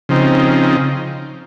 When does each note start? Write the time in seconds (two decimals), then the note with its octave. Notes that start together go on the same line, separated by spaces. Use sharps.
0.09 C#3 F3 C4 D#4